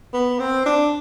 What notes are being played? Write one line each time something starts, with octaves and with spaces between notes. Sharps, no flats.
B3
C4
D4